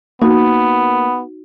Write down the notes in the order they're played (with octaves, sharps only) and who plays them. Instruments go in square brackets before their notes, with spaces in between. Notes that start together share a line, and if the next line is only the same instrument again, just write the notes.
[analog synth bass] A#3 [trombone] B3 [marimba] D#4 F#4